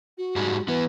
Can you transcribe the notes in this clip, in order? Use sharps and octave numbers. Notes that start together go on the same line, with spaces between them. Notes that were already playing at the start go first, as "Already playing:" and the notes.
F#4
G#2 G3 G#3
E3 B3 B4